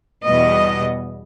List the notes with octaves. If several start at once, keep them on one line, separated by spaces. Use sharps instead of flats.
E2 B2 G3 B3 D#5